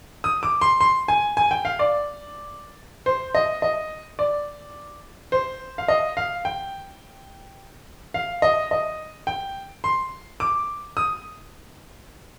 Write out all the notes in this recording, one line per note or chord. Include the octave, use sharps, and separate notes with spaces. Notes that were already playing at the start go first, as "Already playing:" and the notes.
D#6
D6
C6
C6
G#5
G#5
G5
F5
D5
C5
D#5
D#5
D5
C5
F5
D#5
F5
G5
F5
D#5
D#5
G5
C6
D6
D#6